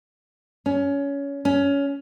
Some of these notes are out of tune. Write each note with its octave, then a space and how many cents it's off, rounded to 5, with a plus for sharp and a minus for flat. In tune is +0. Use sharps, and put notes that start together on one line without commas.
C#4 +20
C#4 +20